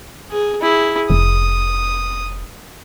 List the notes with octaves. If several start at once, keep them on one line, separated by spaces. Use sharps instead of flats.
G#4
E4 G#4
F1 D#6